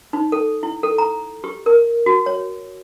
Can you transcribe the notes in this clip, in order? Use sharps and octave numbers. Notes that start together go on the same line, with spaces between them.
D#4
A4
E4
A4
A#5
G4
A#4
F#4
C#5